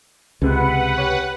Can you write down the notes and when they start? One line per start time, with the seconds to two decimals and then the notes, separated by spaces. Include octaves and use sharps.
0.42 C#2 C3 G#3 B4 F#5
0.98 G4 C#5